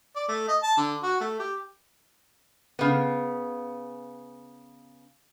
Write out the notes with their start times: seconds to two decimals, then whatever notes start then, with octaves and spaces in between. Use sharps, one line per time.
0.16 D5
0.28 A3
0.48 D#5
0.63 A5
0.77 D3
1.03 F#4
1.21 A3
1.39 G4
2.79 C#3 B3